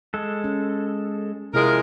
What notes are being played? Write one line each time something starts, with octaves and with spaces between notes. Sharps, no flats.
G#3 A4
C#4
C3 F3 G#3 E4 G#4 A#4